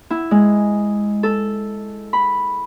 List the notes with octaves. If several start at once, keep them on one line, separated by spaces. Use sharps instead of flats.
E4
G#3
A4
B5